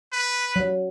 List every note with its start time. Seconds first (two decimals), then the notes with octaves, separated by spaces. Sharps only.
0.12 B4
0.56 F#3